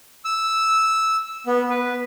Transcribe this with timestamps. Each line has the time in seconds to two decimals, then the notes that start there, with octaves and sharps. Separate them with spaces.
0.25 E6
1.46 B3
1.70 B4